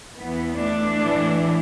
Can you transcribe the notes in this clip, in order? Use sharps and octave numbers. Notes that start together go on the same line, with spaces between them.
E2 E3 B3
A3 D4
A2 E3